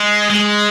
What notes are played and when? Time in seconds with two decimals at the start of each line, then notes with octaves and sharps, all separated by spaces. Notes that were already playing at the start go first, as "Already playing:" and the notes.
Already playing: G#3
0.30 G#3